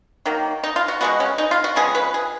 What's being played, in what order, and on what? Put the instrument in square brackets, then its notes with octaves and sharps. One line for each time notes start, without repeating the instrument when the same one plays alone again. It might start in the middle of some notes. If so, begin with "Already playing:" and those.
[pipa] D#3 F#3 A#3
D#4
F4
F#4
B2 G#3 B3 F#4
C#4
D#4
F4
F#4
C#3 F3 G#3 B3 G#4
B4
G#4